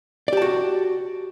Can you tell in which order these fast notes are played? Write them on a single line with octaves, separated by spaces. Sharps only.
D5 G4 A5 F#4